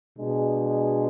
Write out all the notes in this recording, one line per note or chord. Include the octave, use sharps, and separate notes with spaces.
B2 G#3 D4 G#4